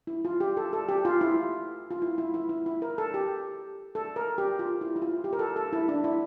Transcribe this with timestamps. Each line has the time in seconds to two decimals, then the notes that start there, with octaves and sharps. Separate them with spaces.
0.07 E4
0.25 F4
0.40 G4
0.57 A4
0.73 A4
0.88 G4
1.05 F4
1.21 E4
1.91 F4
2.02 E4
2.18 E4
2.34 E4
2.49 E4
2.66 E4
2.82 A#4
2.98 A4
3.14 G4
3.95 A4
4.16 A#4
4.38 G4
4.59 F4
4.81 E4
4.96 E4
5.02 F4
5.24 G4
5.33 A#4
5.39 A4
5.56 A4
5.73 E4
5.89 D4
6.04 E4